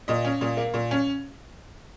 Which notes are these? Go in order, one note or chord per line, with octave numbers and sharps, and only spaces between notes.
A#2 D#5
C#4
A#2
A#3
A#2
C#4